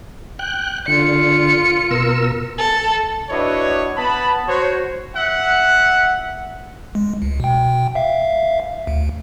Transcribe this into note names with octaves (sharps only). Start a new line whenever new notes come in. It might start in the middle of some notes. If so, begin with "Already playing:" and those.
G5 F#6
D3 F4 C#7
B2 A#4 E6
A4
D4 E4 F#4 B4 C#5 D#5
B3 A5 B5
F#4 C5 C#5
E5 F#5
G#3
C#2
B2 G5
E5 F5
D2